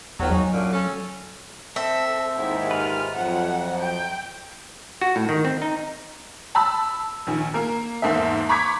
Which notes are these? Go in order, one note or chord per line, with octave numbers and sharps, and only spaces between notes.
E2 D#3 F3 F#3
F#3 G#3 D#4 F#4
F#2 A#2 D3
C#4 A4
C4 A4 E5
D#2 G#2 E4
F4 B4 F6
F2 F3 F#3 F#5
G5
F#4
A2
D#3
C4
D#4
A5 B5 E6
A#1 D#3
A#3 A#4
E2 G#2 A#3 A4 E5
A#5 B5 C#6 D6 G#6 B6